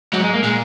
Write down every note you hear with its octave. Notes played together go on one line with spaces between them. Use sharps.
G#2 F#3
G#3
A#3
A#2 G#3